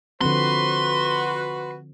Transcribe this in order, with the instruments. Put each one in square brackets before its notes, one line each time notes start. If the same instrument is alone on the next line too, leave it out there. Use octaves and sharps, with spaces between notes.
[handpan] D3 F3 C4 [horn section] F#4 B4 [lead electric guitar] C6